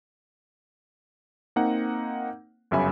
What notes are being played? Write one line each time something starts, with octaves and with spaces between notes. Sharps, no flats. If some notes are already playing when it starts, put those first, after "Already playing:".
A#3 C4 D#4 F#5
G1 F#2 C#3 E5 G#5 B5